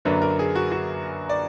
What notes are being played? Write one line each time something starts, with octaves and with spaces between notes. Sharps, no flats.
F#2 D3 F#3 A#3 D4 B4
A#4
G#4
F#4
F#4
D5